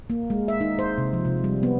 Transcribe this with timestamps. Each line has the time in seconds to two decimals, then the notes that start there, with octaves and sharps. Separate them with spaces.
0.10 A#3
0.30 G#3
0.48 E5
0.61 D#4
0.79 C5
0.98 C3
1.13 F3
1.25 C3
1.44 G3
1.63 B3